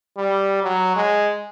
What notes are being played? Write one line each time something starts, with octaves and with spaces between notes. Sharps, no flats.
G3
F#3
G#3